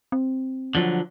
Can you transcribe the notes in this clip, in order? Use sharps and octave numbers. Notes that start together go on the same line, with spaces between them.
C4
D3 F3 F#3